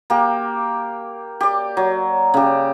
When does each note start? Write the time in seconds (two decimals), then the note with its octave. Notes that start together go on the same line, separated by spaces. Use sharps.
0.10 A#3 G4
1.40 G4 D5
1.77 F#3
2.34 C#3 G4